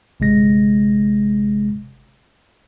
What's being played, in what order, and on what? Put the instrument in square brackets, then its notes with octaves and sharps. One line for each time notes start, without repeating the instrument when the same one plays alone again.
[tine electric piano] G1 C3 G#3 A#6